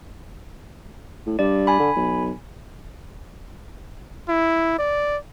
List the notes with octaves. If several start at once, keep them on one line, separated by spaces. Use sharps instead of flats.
A2
G2 D5
G#5 B5
D3
B1
E4
D5